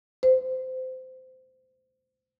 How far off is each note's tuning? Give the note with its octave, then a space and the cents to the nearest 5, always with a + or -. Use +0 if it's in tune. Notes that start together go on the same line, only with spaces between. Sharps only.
C5 -20